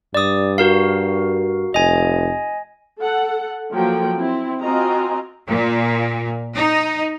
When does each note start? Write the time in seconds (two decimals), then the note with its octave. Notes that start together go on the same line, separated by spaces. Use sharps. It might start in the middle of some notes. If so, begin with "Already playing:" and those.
0.15 G2 D5 D#6
0.58 F#4 A#4 F5
1.74 F1 D#5 G#5
2.99 A4 F#5
3.71 F3 F#3 A#3 A4 G5
4.16 C4 E4
4.62 C4 F4 F#4 D#5 G#5 A#5
5.48 A#2
6.55 D#4